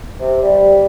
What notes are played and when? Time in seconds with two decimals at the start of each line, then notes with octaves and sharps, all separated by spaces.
0.20 C3
0.43 G3